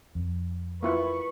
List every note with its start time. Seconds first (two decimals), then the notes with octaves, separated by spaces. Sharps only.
0.15 F2
0.83 A#3 E4 F4 B4 C#6